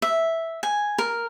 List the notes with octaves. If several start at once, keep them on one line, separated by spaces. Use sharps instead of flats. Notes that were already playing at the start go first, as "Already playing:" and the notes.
E5
G#5
A#4